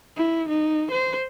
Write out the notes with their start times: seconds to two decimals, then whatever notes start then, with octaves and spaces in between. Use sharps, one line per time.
0.16 E4
0.49 D#4
0.91 C5